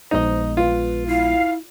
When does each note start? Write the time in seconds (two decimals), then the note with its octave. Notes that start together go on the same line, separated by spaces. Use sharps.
0.11 A#1 G#3 B3 D#4 C5 D#5
0.57 F4 B4
1.07 E4 F5